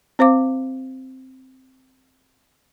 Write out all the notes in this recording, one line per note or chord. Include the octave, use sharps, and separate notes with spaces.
C4 C5 F5 D6